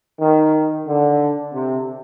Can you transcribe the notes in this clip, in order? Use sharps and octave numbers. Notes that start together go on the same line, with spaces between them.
D#3
D3
C3